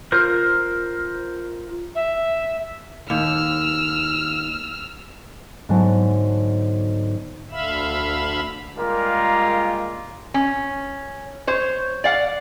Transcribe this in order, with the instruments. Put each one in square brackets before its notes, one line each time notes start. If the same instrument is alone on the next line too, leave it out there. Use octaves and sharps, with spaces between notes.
[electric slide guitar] F4 A#4 C5
[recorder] E5
[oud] D#2 [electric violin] E6 F6
[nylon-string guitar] G#2 D3 F#3 B3 G#5 A5
[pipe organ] D2 D3 E5 F5 B5 E6
[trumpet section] G3 G#3 A#3 F4 A#4
[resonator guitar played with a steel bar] C#4
C5 C#5
D5 F5 F#5